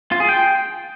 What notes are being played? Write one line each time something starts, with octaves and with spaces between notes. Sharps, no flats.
F4
G#4
G5